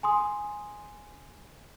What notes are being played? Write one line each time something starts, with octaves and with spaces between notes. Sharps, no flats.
G#5 C6 D#6